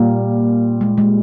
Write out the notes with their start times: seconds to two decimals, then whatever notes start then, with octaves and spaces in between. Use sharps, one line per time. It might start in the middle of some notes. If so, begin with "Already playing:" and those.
Already playing: A#2 G3 A#3 F4
0.81 G#3
0.98 G#3